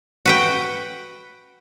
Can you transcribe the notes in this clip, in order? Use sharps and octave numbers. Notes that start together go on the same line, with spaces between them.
F#4 B4 G5